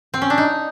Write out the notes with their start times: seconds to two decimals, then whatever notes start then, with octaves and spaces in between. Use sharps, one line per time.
0.14 C4
0.22 C#4
0.30 D4
0.38 D#4